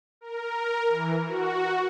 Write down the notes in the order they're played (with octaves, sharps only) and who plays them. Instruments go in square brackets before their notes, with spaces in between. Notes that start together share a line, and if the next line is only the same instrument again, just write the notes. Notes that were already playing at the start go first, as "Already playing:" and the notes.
[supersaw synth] A#4
E3
F#4